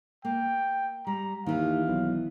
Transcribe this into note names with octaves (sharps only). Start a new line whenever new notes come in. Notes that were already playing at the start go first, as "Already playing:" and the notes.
A#3 G5
G3 A#5
D#2 D#3 E3 F5
B1